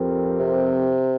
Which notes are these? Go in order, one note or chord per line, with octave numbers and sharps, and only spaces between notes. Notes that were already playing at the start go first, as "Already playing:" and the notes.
Already playing: F2 F3 C4 G4 A#4
C3